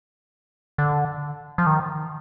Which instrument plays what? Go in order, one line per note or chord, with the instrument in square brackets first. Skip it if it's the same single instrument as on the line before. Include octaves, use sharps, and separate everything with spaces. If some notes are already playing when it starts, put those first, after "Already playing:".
[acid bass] D3
F3
D#3